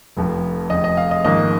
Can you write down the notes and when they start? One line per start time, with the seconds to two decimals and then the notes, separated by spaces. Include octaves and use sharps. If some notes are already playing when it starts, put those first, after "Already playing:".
0.17 F1 F2 F3
0.70 F1 F2 F3 D#5
0.84 D#5
0.97 F5
1.11 D#5
1.24 G#1 G#2 F3 A#3 D#5